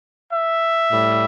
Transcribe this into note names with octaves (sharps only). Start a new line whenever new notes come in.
E5
A2 G3